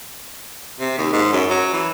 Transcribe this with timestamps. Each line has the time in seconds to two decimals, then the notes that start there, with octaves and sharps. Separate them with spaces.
0.80 C3
0.98 D#2
1.13 G#2
1.32 F#2
1.50 F#3
1.73 E3